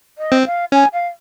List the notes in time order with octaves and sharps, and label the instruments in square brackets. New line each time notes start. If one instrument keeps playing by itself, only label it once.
[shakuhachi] D#5
[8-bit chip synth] C4
[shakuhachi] F5
[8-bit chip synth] C#4 [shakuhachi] G#5
[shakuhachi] F5